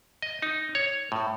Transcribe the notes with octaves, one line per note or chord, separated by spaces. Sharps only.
D#5
D#4
C#5
A2